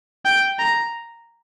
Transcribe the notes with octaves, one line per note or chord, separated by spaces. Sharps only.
G5
A#5